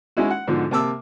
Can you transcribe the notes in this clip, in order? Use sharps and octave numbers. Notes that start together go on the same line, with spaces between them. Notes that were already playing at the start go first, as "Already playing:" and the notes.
G#3 C#4 D#4 E4 F#4
F#5
G#2 B2 D3 F3
C3 A#3 A5 D6 E6